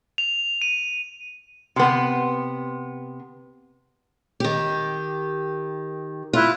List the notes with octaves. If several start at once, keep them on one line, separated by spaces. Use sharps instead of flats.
F7
D#7
C3 B3
D#3 G4
E4 F4 F#6